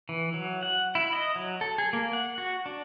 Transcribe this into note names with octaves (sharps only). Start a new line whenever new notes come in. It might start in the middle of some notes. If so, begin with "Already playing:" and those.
E3
F#3
F#5
E4
D#5
F#3
A4
G#4
A#3
F#5
F#4
D4